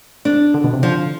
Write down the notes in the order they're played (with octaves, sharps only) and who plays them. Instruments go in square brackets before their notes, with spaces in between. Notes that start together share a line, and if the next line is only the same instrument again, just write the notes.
[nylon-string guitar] D4
[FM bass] D3
B2
C3
[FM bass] D3 [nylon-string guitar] F3